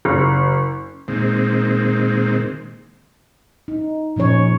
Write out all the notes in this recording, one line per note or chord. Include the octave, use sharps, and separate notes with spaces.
F#1
A#2 D#3 G#3 C4
D#4
A#2 F3 C#4 C#5